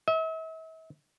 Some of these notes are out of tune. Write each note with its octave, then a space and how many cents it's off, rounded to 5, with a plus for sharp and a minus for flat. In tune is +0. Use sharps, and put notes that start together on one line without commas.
E5 -40